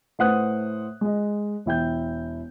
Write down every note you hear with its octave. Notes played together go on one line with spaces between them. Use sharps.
A2 B4 C5 F#5 D#6 F#6
G#3 D#5
E1 E4 G5 G6